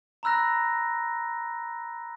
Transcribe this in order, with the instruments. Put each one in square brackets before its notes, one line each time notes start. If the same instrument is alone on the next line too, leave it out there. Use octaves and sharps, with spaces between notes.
[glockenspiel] A#5 B5 E6 F#6 A#6